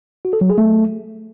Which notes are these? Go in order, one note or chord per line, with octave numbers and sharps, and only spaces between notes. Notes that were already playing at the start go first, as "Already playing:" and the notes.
F#4
A4
F#3
G#4
A3